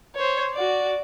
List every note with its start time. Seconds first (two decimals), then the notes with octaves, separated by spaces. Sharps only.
0.16 C5 C#5
0.54 F#4 D5